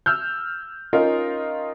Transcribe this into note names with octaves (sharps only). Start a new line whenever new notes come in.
E6 F6 G6
C#4 D#4 F4 A#4 D#5